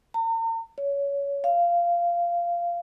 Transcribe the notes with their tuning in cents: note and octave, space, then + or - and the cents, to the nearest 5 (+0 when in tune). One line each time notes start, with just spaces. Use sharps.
A#5 -45
C#5 +20
F5 -15